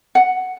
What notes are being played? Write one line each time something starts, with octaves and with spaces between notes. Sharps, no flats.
F#5